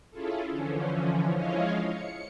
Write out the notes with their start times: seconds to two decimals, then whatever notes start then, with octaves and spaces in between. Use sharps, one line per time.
0.11 C#4 E4 F4 G#4 A4
0.49 D3 E3 F3 C#4
1.31 F3 G#3 E4 C#5 D#5 F5
1.88 C#7